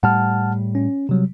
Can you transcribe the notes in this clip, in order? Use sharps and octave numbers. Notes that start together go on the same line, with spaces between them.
A2 G3 F#5 A5 F6
C#4
C3 F#3 G3